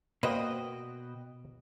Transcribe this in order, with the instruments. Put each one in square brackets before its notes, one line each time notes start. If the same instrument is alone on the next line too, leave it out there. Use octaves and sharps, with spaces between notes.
[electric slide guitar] B2 F#4 G5 [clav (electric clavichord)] A#3 B4 C5 [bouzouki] D#5